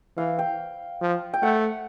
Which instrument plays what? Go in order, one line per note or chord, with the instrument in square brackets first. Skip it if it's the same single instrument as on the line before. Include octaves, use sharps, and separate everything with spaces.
[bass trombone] E3 [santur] F5
[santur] G5
[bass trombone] F3
[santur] G5
[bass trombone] A3 [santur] F#5